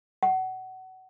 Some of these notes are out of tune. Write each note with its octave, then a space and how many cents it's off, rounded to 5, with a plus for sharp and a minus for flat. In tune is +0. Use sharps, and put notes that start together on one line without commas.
F#5 +25